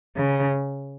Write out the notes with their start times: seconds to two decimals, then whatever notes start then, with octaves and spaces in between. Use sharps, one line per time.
0.17 C#3